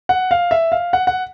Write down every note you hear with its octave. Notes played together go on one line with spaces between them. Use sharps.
F#5
F5
E5
F5
F#5
F#5